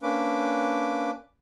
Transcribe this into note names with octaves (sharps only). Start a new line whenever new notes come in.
A#3 C#4 D4 B4 D6